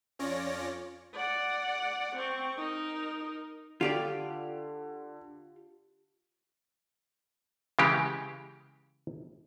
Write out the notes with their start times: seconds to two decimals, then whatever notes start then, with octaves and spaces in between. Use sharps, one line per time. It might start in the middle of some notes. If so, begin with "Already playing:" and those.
0.19 F2 C#4 F4 C#5 D5 A#6
1.14 D5 F#5
2.16 C4 C#6
2.58 D#4 A#4
3.81 D3 F4 G4 D5
7.79 C#3 E3 G#3 G4